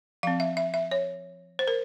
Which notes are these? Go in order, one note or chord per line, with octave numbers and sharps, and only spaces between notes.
F3 C4 F5
E5
E5
E5
C#5
C5
A#4